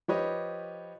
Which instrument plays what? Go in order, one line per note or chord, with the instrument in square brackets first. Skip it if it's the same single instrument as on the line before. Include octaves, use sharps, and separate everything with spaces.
[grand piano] F3 G4 B4 C#5 D#5